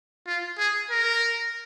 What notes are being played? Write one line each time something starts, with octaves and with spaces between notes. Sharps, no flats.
F4
G#4
A#4